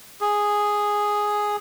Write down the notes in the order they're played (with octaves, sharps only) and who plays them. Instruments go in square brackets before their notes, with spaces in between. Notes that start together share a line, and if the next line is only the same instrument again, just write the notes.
[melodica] G#4